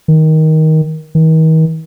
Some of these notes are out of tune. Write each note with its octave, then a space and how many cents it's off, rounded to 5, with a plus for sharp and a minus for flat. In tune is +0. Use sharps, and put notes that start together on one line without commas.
D#3 +15
D#3 +40